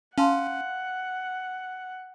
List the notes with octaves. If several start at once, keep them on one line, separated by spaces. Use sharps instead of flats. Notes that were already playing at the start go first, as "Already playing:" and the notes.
C#4 F5 F#5 A5 C6